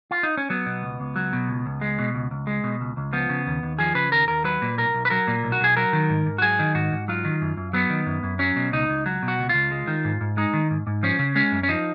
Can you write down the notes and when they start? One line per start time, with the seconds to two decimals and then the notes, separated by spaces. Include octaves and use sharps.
0.11 F4
0.23 D#4
0.37 C#4
0.50 F#3 B3
0.66 B2
0.82 C#2
1.00 C#2
1.16 F#3
1.33 B2
1.48 C#2
1.66 C#2
1.81 G#3
1.99 B2
2.15 C#2
2.31 C#2
2.47 G#3
2.64 B2
2.81 C#2
2.97 C#2
3.13 F3 B3
3.29 C#3
3.47 D#2
3.63 D#2
3.79 F3 G#4
3.95 C#3 B4
4.12 D#2 A#4
4.28 D#2 A#4
4.44 F#3 B4
4.62 A#2
4.78 B1 A#4
4.94 B1
5.05 B4
5.10 F#3 A#4
5.28 A#2
5.43 B1
5.52 F#4
5.61 B1 G#4
5.77 F#3 A#4
5.93 D#3
6.10 G#2
6.26 G#2
6.38 F#4
6.42 F#3 G#4
6.59 D#3
6.74 G#2 F#4
6.92 G#2
7.08 F#3 F4
7.25 D#3
7.41 F#2
7.57 F#2
7.73 F#3 B3
7.90 D#3
8.06 F#2
8.23 F#2
8.39 F#3 C#4
8.56 B2
8.72 C#2 D#4
8.90 C#2
9.06 F#3
9.23 B2
9.28 F#4
9.39 C#2
9.49 C#2 F4
9.71 G#3
9.87 D#3
10.05 G#2
10.21 G#2
10.37 G#3 D#4
10.53 D#3
10.71 G#2
10.87 G#2
11.03 F3 C#4
11.19 C#3
11.35 G#3 C#4
11.52 F#2
11.63 C#4
11.69 F3 D#4